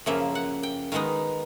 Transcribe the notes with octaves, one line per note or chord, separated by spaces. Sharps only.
F#2 C#3 F3 A#3 E5
F#5
G5
D#3 G#3 B3 D#4 F5